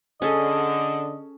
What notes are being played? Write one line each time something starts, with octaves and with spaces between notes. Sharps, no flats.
D3 C#4 G#4 A4 D#5